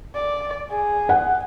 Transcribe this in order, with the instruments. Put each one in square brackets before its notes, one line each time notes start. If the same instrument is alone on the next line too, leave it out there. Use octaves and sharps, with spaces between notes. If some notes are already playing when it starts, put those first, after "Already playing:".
[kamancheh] D5
G#4
[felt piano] F#5